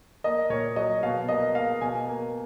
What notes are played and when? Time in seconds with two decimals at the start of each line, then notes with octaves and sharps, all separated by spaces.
0.24 A#3 D#5
0.50 A#2 C#5
0.76 F#3 D#5
1.03 B2 F5
1.29 A#3 D#5
1.55 A#3 F5
1.81 B2 G#5
2.07 A#3